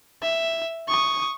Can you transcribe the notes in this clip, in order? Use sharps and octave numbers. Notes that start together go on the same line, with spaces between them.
E5
C#6 D#6